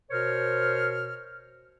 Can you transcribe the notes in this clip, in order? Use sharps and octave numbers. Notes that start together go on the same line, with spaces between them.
B2 A#4 C5 C#5 F6